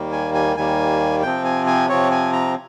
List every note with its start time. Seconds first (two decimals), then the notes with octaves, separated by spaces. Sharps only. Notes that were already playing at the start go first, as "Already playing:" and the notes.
Already playing: D#2 D#3 G3 A#3
0.12 G#5
0.35 G#5
0.56 D#2 D#3 G3 A#3 G#5
1.23 C3 F3 C4 G5
1.45 G#5
1.67 G#5
1.89 C3 F3 C4 C#5
2.11 G#5
2.33 A#5